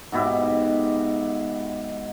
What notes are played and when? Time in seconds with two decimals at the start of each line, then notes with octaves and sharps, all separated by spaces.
0.12 G#2 B2 E4 G4